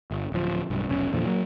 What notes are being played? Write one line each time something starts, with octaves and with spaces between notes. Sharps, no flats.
G1
D1 F3
B1 G2
F1 B1 C#4
E2 A#2 D3 F3
F#3 A#3